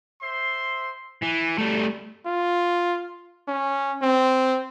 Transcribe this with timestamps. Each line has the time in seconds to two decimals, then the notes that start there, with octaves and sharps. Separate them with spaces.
0.22 C5 E5 C6
1.22 E3
1.58 G3 A3
2.26 F4
3.48 C#4
4.02 C4